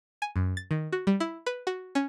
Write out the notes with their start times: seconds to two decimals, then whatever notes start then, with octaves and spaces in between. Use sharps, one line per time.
0.22 G#5
0.36 F#2
0.57 A6
0.71 D#3
0.92 F#4
1.07 G3
1.20 E4
1.46 B4
1.67 F#4
1.95 C#4